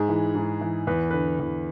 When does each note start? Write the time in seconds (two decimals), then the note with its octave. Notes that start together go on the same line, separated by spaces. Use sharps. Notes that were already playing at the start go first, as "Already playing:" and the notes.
Already playing: G#2 G#4
0.09 E3
0.35 G#2
0.61 E3
0.87 E2 B4
1.11 D3 B4
1.40 E2